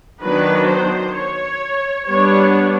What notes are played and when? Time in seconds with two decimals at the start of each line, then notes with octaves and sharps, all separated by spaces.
0.21 D#3 F#3 B3 D4 B4
0.68 C5
1.15 C#5
2.08 G3 B3 D4 C#5